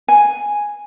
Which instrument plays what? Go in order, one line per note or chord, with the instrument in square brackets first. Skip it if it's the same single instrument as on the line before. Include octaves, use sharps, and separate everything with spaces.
[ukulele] G#5